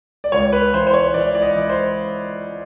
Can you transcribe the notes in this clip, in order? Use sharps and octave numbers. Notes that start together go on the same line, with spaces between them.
D5
C#2 C#5
B4
E3 C5
C5
C#5
E3 D5
D5
D#5
E3
C5